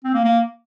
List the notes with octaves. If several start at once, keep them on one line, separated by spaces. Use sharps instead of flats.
C4
A#3
A#3